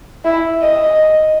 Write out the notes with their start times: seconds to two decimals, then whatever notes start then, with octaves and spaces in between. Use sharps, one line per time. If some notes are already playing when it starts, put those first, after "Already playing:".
0.24 E4
0.61 D#5